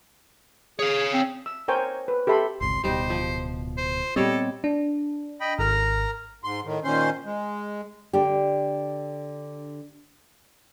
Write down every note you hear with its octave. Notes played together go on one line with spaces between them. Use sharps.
G#4 C#5 F5
C4
E6
A#4 C5 C#5 G5 G#5
B4
G4 A4 E5 B5 C6
G1 C#2 C3 C6
D1 B2 G3 D#4 C5
F3
C5
A#2 G3 B3 C4 A4 C#5 D#5
D4
D#5 G5 B5
G#1 A#4 A#5 F6
G#2 C6
A2 D#3
A#2 D#3 C#4 C5 C6
G#3
D3 D4 G4